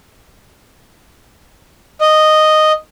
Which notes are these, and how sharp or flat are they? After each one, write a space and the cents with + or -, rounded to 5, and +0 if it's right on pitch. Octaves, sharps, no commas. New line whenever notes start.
D#5 -5